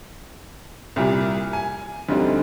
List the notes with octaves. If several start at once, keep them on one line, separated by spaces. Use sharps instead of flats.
C2 A#2 G3
G#5
D2 D3 G3 C4 D#4